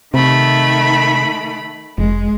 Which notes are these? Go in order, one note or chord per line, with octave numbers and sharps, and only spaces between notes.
C3 D#3 A3 B5
F1 G#3